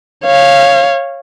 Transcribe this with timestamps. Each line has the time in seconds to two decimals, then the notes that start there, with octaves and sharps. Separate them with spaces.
0.25 C#5 F5